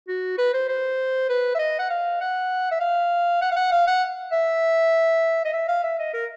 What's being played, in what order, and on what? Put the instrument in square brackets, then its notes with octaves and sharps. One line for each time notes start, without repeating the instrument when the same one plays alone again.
[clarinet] F#4
B4
C5
C5
B4
E5
D#5
F#5
F5
F#5
E5
F5
F#5
F5
F#5
F5
F#5
E5
D#5
E5
F5
E5
D#5
A#4